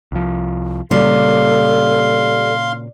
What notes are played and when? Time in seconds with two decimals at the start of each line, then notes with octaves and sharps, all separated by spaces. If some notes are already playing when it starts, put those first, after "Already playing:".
0.12 C2 F3
0.91 A#2 C#3 G3 A#3 A4 F5 C6